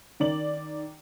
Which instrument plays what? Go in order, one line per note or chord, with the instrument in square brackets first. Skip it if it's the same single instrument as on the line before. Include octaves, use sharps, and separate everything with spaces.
[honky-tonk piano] D#3 D5 F#7